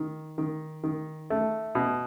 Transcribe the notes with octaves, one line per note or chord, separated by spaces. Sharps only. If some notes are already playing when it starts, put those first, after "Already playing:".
Already playing: D#3
D#3
D#3
A3
B2